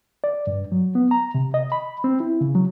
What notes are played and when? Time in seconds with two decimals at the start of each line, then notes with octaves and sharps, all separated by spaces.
0.24 D5
0.47 G2
0.72 F#3
0.95 B3
1.11 A#5
1.35 C3
1.54 D#5
1.72 B5
2.04 C4
2.20 E4
2.41 C#3
2.55 F#3